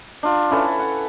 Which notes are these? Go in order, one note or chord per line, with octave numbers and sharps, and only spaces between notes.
D4 F4
C#4 E4 A4 B4
F#5